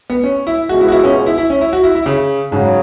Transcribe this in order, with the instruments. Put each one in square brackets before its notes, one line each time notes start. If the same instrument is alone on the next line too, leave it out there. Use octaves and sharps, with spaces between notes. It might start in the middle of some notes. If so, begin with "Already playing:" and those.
[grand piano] B3
C#4
E4
[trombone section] C#2 B2 G#3 [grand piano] F#4
[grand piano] E4
F#4
E4
C#4
E4
E4
C#4
E4
F#4
E4
E4
C#3
[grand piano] G#2 [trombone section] C#3 F#3